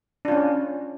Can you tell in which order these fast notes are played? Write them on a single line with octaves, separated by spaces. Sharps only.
D4 F4 C#4